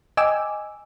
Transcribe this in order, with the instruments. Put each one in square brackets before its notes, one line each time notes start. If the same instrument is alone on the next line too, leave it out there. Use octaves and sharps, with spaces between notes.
[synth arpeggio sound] D#5 G5 G#5 D6 E6